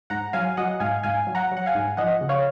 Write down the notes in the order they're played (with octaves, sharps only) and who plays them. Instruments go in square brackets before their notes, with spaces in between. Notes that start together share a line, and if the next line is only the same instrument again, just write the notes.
[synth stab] G#2 F#5 A#5
F#3 F5 G#5
F#3 D#5 F#5
G#2 F5 G#5
G#2 F5 G#5
F#3
F#5 A#5
F#3
F#5
F5 G#5
G#2
F3 D#5 F#5
C#3
C#5 F5